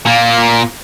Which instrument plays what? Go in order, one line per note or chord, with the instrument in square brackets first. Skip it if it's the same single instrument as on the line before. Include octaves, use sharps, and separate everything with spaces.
[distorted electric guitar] A#2 A#3